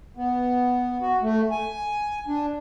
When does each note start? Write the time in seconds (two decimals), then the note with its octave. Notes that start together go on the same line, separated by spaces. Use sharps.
0.17 B3
1.01 F#4
1.22 A3
1.51 G#5
2.28 D4